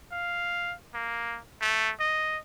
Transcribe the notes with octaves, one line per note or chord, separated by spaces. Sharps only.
F5
A#3
A3
D#5